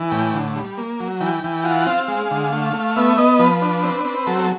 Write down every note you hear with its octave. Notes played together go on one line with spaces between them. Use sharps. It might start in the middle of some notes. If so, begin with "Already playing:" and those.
Already playing: E3
A2 G5
D3
G3
A#3
F#3
E3 G5
E3
F4 F#5
C4 F5
G#3
D3
A3
A3
B3 E5
B3 D#5
F3 B4
D4
C4
C4
F#3 A4
A4